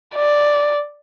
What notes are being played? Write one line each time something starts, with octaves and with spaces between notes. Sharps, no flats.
D5